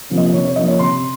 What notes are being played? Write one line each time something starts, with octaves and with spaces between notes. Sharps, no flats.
C3 F3 A#3 C#4
D#5
C3 C#5
C#5
F3 A#3 C#4 D#5
C#5
C3 C6